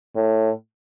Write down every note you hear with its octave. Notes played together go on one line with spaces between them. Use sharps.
A2